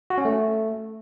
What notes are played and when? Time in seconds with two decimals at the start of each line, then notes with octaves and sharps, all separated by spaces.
0.10 F#4
0.18 C#4
0.25 A3